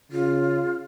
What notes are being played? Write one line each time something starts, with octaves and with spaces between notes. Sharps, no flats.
C#3 F4